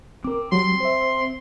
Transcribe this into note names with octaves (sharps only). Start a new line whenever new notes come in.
C4 A#4 D6
F#3 G3 C6
C5 E5